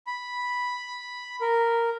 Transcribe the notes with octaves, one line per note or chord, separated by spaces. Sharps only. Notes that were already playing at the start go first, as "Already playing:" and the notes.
B5
A#4